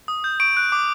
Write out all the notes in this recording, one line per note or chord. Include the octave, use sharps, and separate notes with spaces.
D#6
G6
C#6 D7
F#6
D6